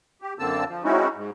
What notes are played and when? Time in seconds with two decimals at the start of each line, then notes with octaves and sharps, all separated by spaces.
0.22 G4
0.39 F#2 D3 A#3 C4 A5 E6
0.67 F3
0.84 G#3 C4 C#4 D#4 E4 F#4
1.15 G#2